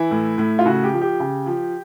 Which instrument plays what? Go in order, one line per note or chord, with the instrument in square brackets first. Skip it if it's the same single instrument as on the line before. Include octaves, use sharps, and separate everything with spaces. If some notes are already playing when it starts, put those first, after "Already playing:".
Already playing: [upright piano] E3 E4
A2
A2
F4
C#3 F#4
G4
F3
G4
C#3
F3